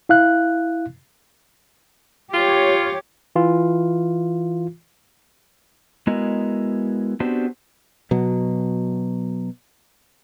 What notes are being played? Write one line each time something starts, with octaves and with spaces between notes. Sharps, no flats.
E4 F5 F#6
F4 G4 C#5
E3 F4
G#3 B3 E4 F#4 A#4 D#5
B3 C4 D4 F#4 G4 C5
B2 F#3